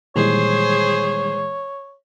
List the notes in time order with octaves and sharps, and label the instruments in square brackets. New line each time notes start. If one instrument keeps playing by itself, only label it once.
[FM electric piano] A#2 E3 G#3 [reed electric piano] D#3 G3 [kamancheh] G#4 C5 [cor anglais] C#5